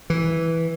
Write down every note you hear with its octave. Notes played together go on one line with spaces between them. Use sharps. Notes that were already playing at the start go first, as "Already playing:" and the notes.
E3